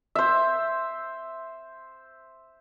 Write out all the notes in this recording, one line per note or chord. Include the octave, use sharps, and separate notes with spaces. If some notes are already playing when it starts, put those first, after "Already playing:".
C5 E5